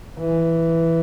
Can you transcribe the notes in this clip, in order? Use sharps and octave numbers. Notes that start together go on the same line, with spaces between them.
E3